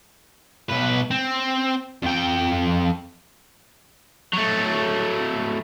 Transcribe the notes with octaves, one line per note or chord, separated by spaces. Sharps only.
B1 B4
C4
F2 G5
F#3 A3